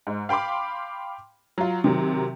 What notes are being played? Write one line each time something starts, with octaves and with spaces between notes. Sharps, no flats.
G#2
F5 G5 B5 C6 D6
F#3 F4
C3 D#3 F#3